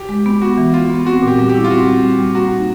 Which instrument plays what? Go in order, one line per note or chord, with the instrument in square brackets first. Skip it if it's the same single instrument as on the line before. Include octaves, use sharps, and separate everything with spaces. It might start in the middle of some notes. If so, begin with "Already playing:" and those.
Already playing: [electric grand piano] G4
[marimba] G#3
B3
[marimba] B3 [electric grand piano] F#4
[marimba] E3
[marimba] B3 [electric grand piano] F4
[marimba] B3
[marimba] C4 [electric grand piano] F#4
[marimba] A#2
[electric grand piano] G4
[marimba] G3
[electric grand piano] G4
[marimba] E4
[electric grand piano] F4
[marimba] C4 [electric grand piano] F#4
[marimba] G3
G3
G3
[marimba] A#3 [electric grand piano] F#4
[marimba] D#4